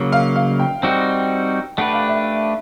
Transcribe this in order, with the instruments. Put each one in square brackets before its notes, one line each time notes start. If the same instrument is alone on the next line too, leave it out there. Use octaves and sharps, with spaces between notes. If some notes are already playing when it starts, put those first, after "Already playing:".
Already playing: [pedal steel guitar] C#3 F#3 A#3
[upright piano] F5
F5
G5
[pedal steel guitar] G3 C4 D#4 F#4 [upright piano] G5
[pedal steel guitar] A3 D4 G4 B4 [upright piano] F#5
[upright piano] F5
E5